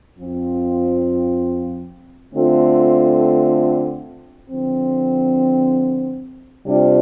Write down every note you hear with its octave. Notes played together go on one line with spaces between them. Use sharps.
F2 F3 C4 F4
D3 A3 C4 F4
D3 F3 C4
C3 G3 D4 F4